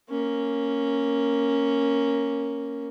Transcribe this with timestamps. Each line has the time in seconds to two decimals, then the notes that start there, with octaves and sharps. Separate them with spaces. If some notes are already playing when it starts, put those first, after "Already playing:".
0.10 A#3 C#4